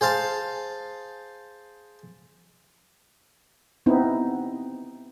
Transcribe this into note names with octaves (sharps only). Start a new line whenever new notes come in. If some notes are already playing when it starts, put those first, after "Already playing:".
G#4 C5 F5 A5
B3 C4 D#4 E4